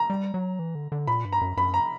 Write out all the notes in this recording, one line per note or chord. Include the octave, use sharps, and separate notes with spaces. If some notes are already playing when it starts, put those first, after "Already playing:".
Already playing: A#5
G3
F#3
E3
D3
D3
A#2 B5
G2
A#5
F#2
F#2 B5
A#5